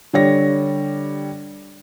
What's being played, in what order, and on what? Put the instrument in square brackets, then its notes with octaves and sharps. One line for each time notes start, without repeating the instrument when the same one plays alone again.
[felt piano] D3 G3 C#5 A#6